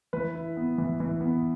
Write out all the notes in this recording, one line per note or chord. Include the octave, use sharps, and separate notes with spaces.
E3 B4 B5
E4
B3
E3
E3
B3